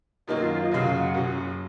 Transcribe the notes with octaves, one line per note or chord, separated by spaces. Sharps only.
F#2 D#3 F#3 A#3 D#5
F4
F4
D#5
F#1 F#2 C#3 F#3 F5
F5
F#5
F#1 F#2 C#3 F#3